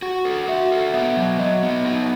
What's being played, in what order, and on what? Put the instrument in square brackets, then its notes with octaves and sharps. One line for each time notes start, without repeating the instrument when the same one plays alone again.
[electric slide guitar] F#4 [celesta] F#5
[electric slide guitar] A4
[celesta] F#5
[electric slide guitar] F#4 [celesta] E5
[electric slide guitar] A4
[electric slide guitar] B3 [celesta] E5
[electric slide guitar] F#3
[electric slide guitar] F#3 [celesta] D#5
[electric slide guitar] B3
D#4